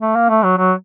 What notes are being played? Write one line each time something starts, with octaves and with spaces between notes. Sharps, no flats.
A3
A#3
A3
F#3
F#3